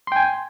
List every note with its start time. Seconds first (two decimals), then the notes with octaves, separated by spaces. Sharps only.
0.07 C6
0.12 G5
0.16 G#5